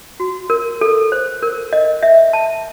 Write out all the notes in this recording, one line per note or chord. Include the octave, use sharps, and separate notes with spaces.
F#4
A#4
A4
C5
A#4
D#5
E5
A5